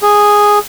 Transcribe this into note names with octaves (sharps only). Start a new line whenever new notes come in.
G#4